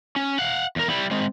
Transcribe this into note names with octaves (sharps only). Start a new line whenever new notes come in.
C#4
F5 F#5
E2 A#4
G3 E4
G#3 C4